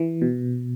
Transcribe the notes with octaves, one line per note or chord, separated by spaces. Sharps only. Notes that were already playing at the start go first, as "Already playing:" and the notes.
Already playing: E3
B2